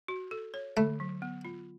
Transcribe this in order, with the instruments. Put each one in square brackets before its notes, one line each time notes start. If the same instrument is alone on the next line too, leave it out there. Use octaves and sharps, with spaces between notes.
[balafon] F#4
A4
C#5
[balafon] D3 [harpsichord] A3
[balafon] F#3
B3
F4